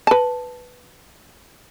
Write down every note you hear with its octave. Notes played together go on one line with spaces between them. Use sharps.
B4 A5